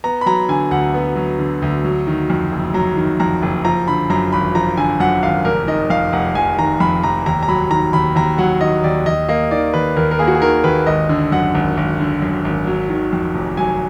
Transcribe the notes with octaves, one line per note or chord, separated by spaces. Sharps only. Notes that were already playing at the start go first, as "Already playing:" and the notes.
B3 A#5
B5
F#3 A#5
D3 G#5
D2 F#5
B3
F#3
D3
D2
F#3
D#3
F2
F#1
F#3 A#5
D#3
F2 A#5
F#1
F3 A#5
D3 B5
F#2 A#5
G#1 B5
F3 A#5
D3 G#5
F#2 F#5
G#1 F5
F1 A#4
D#3 D#5
F2 F5
F1 F#5
F1 G#5
D#3 A#5
F2 B5
F1 A#5
D#2 A#5
A#5
F#3 B5
D#3 A#5
D#2 B5
D#2 A#5
F#3 F#5
D#3 D#5
D#2 D5
D#2 D#5
A#3 D#5
D#3 D5
D#2 B4
D#2 A#4
A#4
A#3 G#4
F#4
G#4
D#3 A#4
D#2 B4
G#1 D#5
D3
F#2 F#5
G#1
G#1
D3
F#2
G#1
F#3
D#3
F2
F1
F#3 G#5